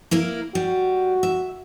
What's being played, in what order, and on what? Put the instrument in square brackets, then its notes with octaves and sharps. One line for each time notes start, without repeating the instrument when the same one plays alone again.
[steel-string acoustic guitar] A#3 E4 A#4
[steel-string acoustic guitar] G3 [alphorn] F#4
[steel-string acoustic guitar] E5